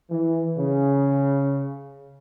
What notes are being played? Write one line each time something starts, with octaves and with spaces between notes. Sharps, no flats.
E3
C#3